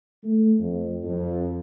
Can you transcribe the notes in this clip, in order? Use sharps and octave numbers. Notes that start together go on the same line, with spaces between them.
A3
F2
F2